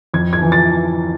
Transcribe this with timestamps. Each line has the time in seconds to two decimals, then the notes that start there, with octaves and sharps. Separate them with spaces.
0.14 F2 G#6
0.33 G#6
0.42 E3
0.52 A6